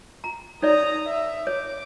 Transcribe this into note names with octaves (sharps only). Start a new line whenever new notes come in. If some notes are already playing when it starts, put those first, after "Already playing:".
A#5
D#4 C#5 D5 A#5 D#6
E5
C#5 D6